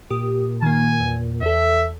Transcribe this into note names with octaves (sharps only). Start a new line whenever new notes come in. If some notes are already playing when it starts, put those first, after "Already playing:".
A#2 G4 D#6
D#3 A#3 G#5
E2
E2 A4 E5